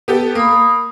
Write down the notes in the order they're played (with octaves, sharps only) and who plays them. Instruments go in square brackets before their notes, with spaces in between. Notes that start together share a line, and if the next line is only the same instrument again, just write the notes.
[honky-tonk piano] B3 G4 A4
[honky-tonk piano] A#3 [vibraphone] B5 D#6